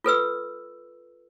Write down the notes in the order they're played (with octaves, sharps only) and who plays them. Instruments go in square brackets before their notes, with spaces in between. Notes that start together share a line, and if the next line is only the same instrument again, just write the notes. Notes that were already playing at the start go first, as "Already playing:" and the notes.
[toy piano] F4 A4 B4 E6